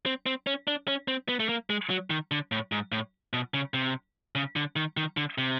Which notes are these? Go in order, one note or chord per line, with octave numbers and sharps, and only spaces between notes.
C4
C4
C#4
D4
C#4
C4
B3
A3
A#3
G#3
F#3
D#3
D3
A2
G#2
A2
B2
C#3
C3
C#3
D3
D#3
D#3
D3
C3